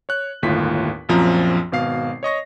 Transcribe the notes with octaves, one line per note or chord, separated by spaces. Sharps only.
C#5 F#6
G1 D#2 A2 F4 B6
A#1 F#2 F3 C4 A#5
G#1 B2 F5 C7
C#5 D#5 C#6 A#6